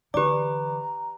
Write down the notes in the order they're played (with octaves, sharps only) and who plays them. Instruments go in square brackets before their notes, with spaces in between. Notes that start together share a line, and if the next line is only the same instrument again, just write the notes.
[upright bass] D3 E3 [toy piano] G4 D5 [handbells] B4 D6 [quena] A#5